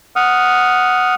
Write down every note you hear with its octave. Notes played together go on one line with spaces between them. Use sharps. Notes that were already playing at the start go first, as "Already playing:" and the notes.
F#5 D#6 F6